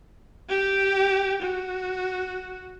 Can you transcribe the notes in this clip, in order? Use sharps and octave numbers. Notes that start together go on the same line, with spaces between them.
G4
F#4